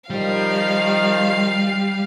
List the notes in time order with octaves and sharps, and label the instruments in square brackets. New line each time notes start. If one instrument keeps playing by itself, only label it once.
[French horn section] D#3 F3 [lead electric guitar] G3 [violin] F5